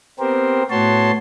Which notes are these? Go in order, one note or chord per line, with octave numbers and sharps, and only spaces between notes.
B3 C4 G4 A#4 C5
A2 B3 F#4 C#5 A5 C6